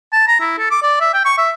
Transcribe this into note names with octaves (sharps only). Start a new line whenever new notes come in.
A5
A#5
E4
A4
D6
D5
E5
G5
C#6
E5